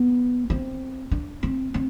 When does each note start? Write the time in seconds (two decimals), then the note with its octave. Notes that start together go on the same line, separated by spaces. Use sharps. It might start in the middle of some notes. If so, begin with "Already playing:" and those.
Already playing: B3
0.50 C4
1.11 D4
1.43 C4
1.74 C4